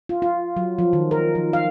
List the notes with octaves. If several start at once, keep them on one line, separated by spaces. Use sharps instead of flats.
F4
F4
F#3
F3
D#3
A#4
F3
F5